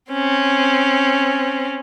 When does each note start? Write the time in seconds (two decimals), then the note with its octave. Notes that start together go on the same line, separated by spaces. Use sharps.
0.11 C4 C#4